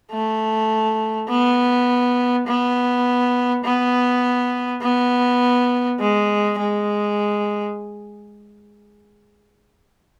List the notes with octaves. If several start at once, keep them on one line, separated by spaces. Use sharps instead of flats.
A3
B3
B3
B3
B3
G#3
G#3